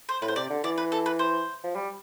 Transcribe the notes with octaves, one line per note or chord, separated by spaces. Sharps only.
C5
A2 B4
C5
C3 D5
D3
E3 D5
B4
A4
B4
C5
F3
G3